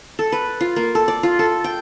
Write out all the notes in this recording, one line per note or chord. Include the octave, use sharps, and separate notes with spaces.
A4
B4
F4
A#3
A4
D5
F4
A4
G5